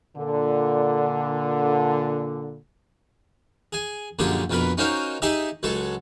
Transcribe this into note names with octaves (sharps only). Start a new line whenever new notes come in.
A#2 D3
G#4 G#5
A#1 F#2 D3 A#3 G4 G#4
A#1 F2 B2 A#4 B4 B5
C#4 D#4 F4 F#4 A#4 C5
D#4 G4 G#4 D#5 E5
C#2 F#3 G#3 A4 C#6